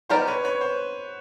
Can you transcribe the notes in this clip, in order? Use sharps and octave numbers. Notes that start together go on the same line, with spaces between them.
B3 D#4 G4 A#4 C5 D5
B4 C#5
B4 C#5
C5